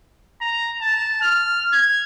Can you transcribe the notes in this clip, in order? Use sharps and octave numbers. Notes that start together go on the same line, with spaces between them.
A#5
A5
F6
G#6